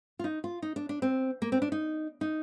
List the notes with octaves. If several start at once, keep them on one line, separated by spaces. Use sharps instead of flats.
F4
D#4
F4
D#4
D4
D4
C4
A#3
C4
D4
D#4
D#4